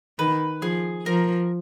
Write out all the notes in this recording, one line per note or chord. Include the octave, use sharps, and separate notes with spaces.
D#3 B4
F3 G#4
F3 A#4